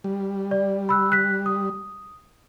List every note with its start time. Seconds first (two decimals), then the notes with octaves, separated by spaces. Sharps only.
0.04 G3
0.51 D5
0.89 B5 E6 F#6
1.12 F#6 B6
1.46 D#6